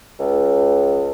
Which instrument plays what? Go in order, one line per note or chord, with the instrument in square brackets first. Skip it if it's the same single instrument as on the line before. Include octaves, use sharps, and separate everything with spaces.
[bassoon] C#2